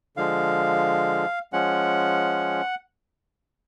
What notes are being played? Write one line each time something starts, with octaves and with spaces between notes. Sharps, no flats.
D3 F3 G#3 F5
F3 G#3 C#4 F#5